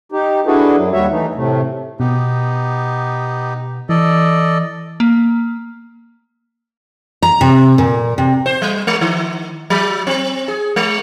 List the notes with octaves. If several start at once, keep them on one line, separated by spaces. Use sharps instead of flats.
D#4 G4
D4 E4 F#4 G#4 A4 B4
F#2 F#3
D#2 G3 F#4 C#5 E5
E3 A3 D#4
A2 C3 A3
B2 B3 D#4 G4
E3 A4 D5 D#5
A#3
A#5
C3
A#2
C3
C5
G3
G#3
D#3
F#3
C4
G#4
G#3